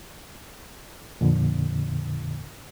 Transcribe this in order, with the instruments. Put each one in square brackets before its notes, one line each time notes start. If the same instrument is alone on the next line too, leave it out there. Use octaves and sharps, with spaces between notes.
[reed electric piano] F2 A#2 D3